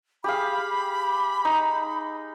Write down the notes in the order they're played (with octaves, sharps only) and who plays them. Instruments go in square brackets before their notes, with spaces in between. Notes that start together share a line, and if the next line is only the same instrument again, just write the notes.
[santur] G4 G#4 F5 [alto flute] B5
[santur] D#4